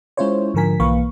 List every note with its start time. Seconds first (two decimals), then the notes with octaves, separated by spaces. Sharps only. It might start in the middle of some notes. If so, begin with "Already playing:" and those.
0.17 G#3 C#4 E4 F4 C5 C#5
0.54 G#2 D3 F3 A#4 G#5 B6
0.80 B1 E3 A#3 B4 F5 C#6